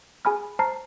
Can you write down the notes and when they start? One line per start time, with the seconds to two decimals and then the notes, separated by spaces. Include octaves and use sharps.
0.25 G#4 G#5 B5 F6
0.59 C5 A5 A#5 F6 C7